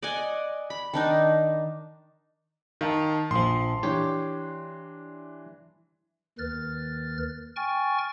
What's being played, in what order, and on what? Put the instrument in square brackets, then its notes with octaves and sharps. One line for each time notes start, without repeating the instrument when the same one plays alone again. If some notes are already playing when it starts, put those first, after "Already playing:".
[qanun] D5 D#5 F#5 G#5
B5
D#3 D4 D#4
[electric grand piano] D#3 [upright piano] F5 A5
[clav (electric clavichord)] A#1 F3 [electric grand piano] C6
[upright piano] E3 D4 [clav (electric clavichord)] G4 C#5
[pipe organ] D#2 D#3 B4 F6 A6
G5 G#5 C#6 F6 A6